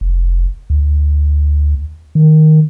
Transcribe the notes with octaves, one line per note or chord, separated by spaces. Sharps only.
F1
D2
D#3